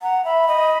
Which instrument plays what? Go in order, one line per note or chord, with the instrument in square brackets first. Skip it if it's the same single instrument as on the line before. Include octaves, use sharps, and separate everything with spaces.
[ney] F#5 [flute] A#5
[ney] E5 [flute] B5
[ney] D#5